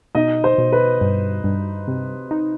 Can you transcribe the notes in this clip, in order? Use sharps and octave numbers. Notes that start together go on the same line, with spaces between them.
B2 D#4 D#5
C5
B2
B4
G2
G2
C3
D#4